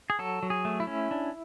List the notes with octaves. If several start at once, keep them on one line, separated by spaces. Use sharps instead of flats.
G#4
F#3 A4
F#3
G#4
A3
E4
C#4
D4